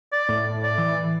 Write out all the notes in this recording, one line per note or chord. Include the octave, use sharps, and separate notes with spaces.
D5
A2
D5
E3